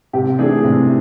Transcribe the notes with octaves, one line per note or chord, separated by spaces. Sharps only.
C3 G4
E3 A3 D4 G#4
C3